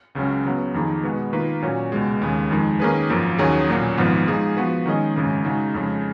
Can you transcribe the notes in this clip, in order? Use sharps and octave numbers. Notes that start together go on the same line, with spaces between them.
C#2 C#3 F#3 C#4
C#3 F#3 B3
F2 D#3 A#3 D#4 G#4
B2 G#3 B3 F#4
D#3 A#3 F4 B4
A#2 F#3 C#4 F#4
C#2 B2 G#3
D#2 C#3 G#3
F2 D#3 G#3
D#3 A#3 C#4 G#4 B4
G#1 F#2 F3 A#3
D#2 D#3 F#3 C#4 G#4
B1 A#2 F#3 A#3 C#4
G#1 G#2 F3 B3
F3 G#3 D#4 G#4
F3 B3 F#4 B4
D#3 G#3 C#4 G#4 D#5
G#1 F#2 C#3 G#3
C#3 G#3 D#4 F#4
F2 C#3 G#3